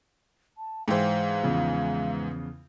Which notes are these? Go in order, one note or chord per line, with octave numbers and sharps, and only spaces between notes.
A5
G#2 E3 C5 F5 G5
E2 C#3 F3